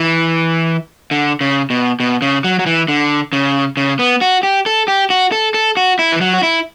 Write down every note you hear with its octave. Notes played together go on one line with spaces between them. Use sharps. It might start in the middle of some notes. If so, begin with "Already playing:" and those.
Already playing: E3
D3
C#3
B2
B2
C#3
F#3
F#3
E3
D3
C#3
C#3
B3
F#4
G4
A4
G4
F#4
A4
A4
F#4
E4
E3
F#3
F#4
E4